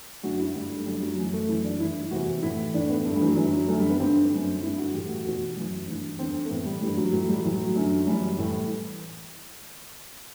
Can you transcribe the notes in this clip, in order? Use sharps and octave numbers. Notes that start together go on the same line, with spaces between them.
F#2 D3 F#4
E4
G2 D3 G3
A3
F#2 D3 G3
F#3
F#2 E3
A3
F#2 E3 E4
D4
G2 E3 E4
E4
E2 C3 E3 F#4
A2 E3 E4
A2 E3 D4
B3
G2 D3 A3
G3
E3
F#3
F#2 D3 E3
F#3
F#2 D3 A3
G3
B3
G2 D3 C4
F#2 D3
G2 D3 E4
F#4
A2 E3 G4
F#4
E2 B2 F#4
F#2 E3
G2 E3
E2 D3 C4
A3
A2 E3 B3
G3
G2 E3 G3
F#3
A2 E3 F#3
G3
F#3
A2 E3
F#3
F#2 D3
F#2 E3 G3
A2 E3